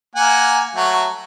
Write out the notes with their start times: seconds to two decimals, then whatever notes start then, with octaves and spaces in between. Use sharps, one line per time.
0.16 A#3 F#5 G#5
0.75 F#3 A3 F#4